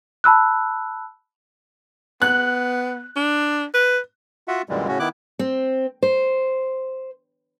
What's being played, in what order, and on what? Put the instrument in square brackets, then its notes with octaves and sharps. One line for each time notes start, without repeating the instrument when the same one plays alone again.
[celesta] A5 B5 E6 F#6
[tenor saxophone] B3 [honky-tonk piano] F#6
[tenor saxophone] D4
B4
[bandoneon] F4 F#4 E5 F#5
F#2 A#2 D3 E3 G3 G#3
A2 C#3 C#4 F#4
D#3 B3 E4 D6 F#6
[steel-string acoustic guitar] C4
C5